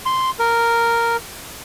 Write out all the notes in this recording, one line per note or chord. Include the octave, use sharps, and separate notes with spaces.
C6
A#4